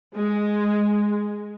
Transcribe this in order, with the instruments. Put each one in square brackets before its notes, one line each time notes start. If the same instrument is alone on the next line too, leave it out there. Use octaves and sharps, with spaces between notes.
[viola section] G#3